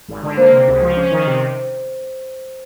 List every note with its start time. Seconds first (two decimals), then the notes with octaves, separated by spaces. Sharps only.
0.08 G#1
0.23 D3
0.38 A#3 C5
0.52 C3
0.67 C#2
0.81 F3
0.97 C#4
1.11 D#3
1.26 C3